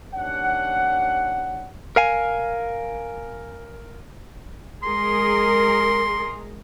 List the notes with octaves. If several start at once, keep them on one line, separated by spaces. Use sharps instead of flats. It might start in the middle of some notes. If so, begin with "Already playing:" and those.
D#2 C#4 D4 F#5
A#4 F5 G#5
G#3 G#4 A#4 C6